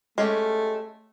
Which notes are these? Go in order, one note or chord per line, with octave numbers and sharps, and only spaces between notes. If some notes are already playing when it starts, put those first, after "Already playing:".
G#3 A3 C#4 G4